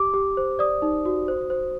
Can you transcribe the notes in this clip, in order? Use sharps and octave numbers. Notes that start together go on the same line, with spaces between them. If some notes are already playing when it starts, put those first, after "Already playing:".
Already playing: G4 D6
G4
C5
D5 D#6
D#4
F#4
C5
C5